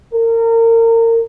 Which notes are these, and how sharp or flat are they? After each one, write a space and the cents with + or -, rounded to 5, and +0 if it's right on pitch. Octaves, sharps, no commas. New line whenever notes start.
A#4 -30